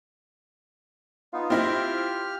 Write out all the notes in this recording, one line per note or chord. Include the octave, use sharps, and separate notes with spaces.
B3 D#4 F4
C4 E4 G4 F6 A#6